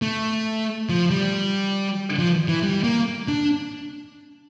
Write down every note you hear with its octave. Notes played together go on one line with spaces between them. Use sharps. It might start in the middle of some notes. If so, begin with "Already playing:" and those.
A3
F3
G3
F3
E3
G3
A#3
D4